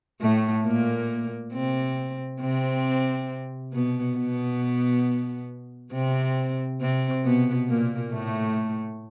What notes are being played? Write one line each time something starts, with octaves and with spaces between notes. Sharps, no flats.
A2 A3
A#2 A#3
C3 C4
C3 C4
B2 B3
B2 B3
C3 C4
C3 C4
B2 B3
A#2 A#3
A2 A3